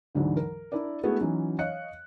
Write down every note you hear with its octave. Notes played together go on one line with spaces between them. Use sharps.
D2 G#2 D3 E3 F#3
A#4
D4 E4 A#4 D5
G#3 A3 B3 E4 F#4 G#4
E3 F#3 C#4 D#4
C#5 D#5 F5 F#6 C#7